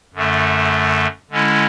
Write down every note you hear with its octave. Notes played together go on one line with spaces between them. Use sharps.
F#2 D3 A3
D3 G#3 C#4 E4